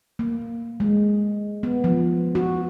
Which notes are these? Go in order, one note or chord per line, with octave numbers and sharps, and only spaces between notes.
A#3
G#3
B3
F3
F#4